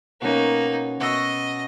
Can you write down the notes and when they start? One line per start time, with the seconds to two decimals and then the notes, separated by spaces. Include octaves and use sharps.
0.22 B2 A#3 C#4 D#4
1.00 B2 D#5 C#6 E6